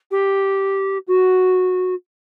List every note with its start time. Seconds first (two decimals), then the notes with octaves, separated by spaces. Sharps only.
0.11 G4
1.08 F#4